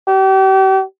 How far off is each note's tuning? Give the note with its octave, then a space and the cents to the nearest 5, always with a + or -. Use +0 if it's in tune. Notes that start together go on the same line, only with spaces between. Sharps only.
G4 -40